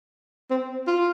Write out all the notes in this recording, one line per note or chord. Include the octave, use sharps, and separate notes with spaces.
C4
F4